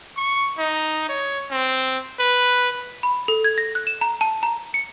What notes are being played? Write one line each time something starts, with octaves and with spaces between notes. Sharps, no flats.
C#6
D#4
C#5
C4
B4
B5
A4
G#6
A#6
F#6
E7
A#5
A5
A#5
C#7